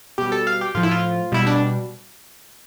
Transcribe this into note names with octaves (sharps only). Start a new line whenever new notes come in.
B2 G3 G4
A4
F5
G4
A2 F3 F4
E4
F4
B2 G3 E4
D4